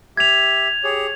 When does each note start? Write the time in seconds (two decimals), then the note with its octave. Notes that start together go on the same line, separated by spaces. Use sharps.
0.17 G4 E5 G#6 F7
0.84 G4 G#4 C#5